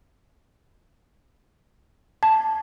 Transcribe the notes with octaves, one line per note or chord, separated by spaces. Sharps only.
A5